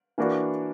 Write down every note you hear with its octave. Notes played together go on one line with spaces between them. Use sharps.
E3 A#3 D4 F#4 B4